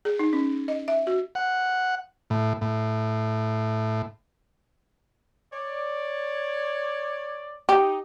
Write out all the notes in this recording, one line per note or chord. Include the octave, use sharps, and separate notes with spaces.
G#4
D#4
C#4
D#5
E5
F#4
F#5
A2
A2
C#5 D5
D#4 G4